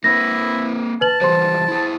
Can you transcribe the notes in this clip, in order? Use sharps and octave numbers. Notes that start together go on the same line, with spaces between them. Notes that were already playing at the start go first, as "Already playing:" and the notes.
A#3 C4 E4 B4 A#6
B4 A5 F#7
E3 F3 G3 C5 C6
E4 G#4